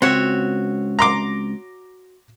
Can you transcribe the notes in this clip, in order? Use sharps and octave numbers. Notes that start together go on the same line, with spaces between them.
C#2 C4 F#4 C#5 E5
A#5 C6 D6